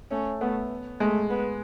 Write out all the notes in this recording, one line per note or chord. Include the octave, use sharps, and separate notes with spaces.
A3 C#4
A3 B3
G#3 A3
B3